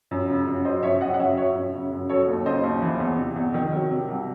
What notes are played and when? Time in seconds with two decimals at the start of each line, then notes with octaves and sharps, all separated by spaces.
0.11 F#2
0.29 C#3
0.47 F#2
0.65 F#3 C5 D#5
0.83 F#2 C#5 E5
1.01 C#3 D#5 F#5
1.14 F#5
1.19 F#2 C#5 E5
1.37 F#3 C#5 E5
1.55 F#2
1.74 C#3
1.92 F#2
2.09 F#3 A4 C#5
2.28 D#2
2.45 C#3 C5 D#5
2.64 D#2
2.82 E3
3.00 E2
3.17 C3
3.36 E2
3.54 D#3
3.72 F#3
3.91 C3
4.08 C2